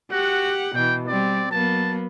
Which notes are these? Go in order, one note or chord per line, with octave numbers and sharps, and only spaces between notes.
F#4 G4 F#5
B2 E3 G5
G3 C4 D5
F#3 A#3 B3 A5